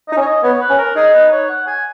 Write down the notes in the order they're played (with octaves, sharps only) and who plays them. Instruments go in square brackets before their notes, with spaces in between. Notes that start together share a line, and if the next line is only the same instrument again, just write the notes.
[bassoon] D#4 [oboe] D#5
[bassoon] C#4
[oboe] C#5
D#5
[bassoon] B3 [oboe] C#5
[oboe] B4
[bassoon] C#4
[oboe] A#4
[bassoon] D#4 [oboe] G#4
[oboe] B4
C#5
F#5
G#5